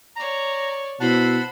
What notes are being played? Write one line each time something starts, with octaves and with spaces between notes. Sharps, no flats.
C#5 D5 A#5
B2 E4 C5 F#5 A5 B5